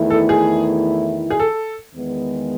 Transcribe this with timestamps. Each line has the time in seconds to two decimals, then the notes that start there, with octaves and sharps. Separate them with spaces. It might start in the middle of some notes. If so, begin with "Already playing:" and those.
Already playing: E2 D#3 A3 E4
0.10 A4
0.29 G#4
1.30 G#4
1.40 A4
1.94 E2 D#3 G#3 B3